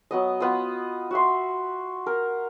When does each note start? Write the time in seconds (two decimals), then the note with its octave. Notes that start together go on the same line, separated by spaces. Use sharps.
0.11 F#3 B3 D#5
0.40 B3 F4 D#5
1.11 F#4 E5 C6
2.07 A#4